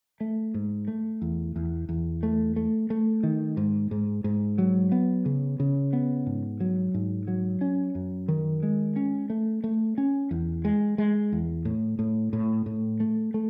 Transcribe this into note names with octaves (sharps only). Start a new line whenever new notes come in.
A3
G#2
A3
E2
E2
E2
A3
A3
A3
D#3
G#2
G#2
G#2
F#3
B3
C#3
C#3
B3
G#2
F#3
G#2
F#3
C#4
F#2
D#3
G#3
C#4
A3
A3
C#4
E2
G#3
G#3
E2
A2
A2
A2
A2
A3
A3